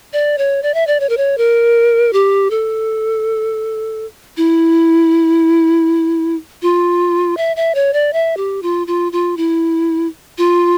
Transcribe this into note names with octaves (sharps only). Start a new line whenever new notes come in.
D5
C#5
D5
E5
D5
C#5
A#4
C#5
A#4
G4
A4
E4
F4
E5
E5
C#5
D5
E5
G4
F4
F4
F4
E4
F4